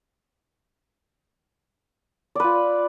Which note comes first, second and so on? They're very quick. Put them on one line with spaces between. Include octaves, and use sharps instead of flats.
D5 B4 F4